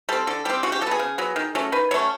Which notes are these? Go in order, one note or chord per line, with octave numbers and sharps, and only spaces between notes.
G3 C4 A4
D3 A4
G3 C4 G4
C#3 F#4
G4
F#3 A4
B3 G#4
C#3
F#3 B3
D#3
F#3 A3 C#4
D#3 B4
F#3 A3 C#4 C#5